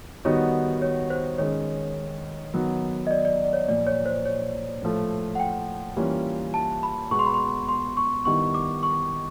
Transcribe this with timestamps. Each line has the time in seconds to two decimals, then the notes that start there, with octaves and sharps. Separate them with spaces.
0.25 D#3 G3 B3 D#4 F#4 C#5
0.82 C#5
1.10 C5
1.38 D#3 G#3 C#4 C#5
2.54 D#3 F#3 B3
3.07 D#5
3.11 D5
3.25 D5
3.44 D5
3.53 C#5
3.68 A#2 F3 A#3 D5
3.87 C#5
4.06 C5
4.26 C#5
4.82 A2 F3 A3
5.35 F#5
5.40 G5
5.96 E3 G3 A#3 C#4 F4
6.54 A5
6.83 B5
7.11 B2 G#3 B3 C#6
7.19 C6
7.26 B5
7.34 C6
7.69 C6
7.97 C#6
8.25 D#3 G3 B3 E4 C#6
8.54 D6
8.83 C#6